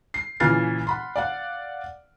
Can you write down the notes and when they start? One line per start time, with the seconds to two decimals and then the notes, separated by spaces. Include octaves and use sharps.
0.14 C7
0.40 A#2 C#3 E3 F6 A6 C7
0.87 F#5 B5 C6
1.16 D5 F5 F#5